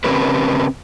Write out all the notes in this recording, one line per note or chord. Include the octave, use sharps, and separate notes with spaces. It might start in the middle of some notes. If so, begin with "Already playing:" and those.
C#3 C4 C#4 G4 A#4 B4